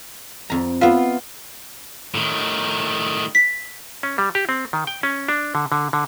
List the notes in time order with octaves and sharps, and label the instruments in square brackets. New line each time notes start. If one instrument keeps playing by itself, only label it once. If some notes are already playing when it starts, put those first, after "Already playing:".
[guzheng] F2 A#5
[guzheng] B3 E5 [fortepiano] F4
[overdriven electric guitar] A2 D#3
[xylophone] B6
[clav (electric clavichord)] C#4
G3
G4
C4
D#3
G5
C#4
D4
D3
D3
D3